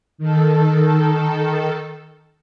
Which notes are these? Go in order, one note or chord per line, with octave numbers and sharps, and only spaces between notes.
D#3 A4